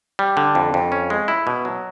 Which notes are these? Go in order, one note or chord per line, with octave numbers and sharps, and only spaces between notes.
G3
D3
F2
F2
C#4
G#3
E4
B2
F#3